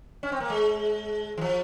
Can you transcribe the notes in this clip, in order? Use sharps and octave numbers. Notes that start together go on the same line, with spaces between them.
C#4
C4
A#3
G#3
E3
F3